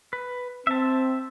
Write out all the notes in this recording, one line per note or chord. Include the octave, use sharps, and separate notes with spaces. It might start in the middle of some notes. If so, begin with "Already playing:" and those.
B4
C4 E5 A5